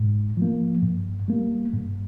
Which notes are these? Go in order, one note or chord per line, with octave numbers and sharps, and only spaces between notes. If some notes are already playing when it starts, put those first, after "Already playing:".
Already playing: G#2
F3 A#3
G2
G3 A#3
G2